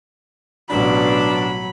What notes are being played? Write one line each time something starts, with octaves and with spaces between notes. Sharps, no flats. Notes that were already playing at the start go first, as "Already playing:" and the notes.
A1 B2 F#3 D4 B5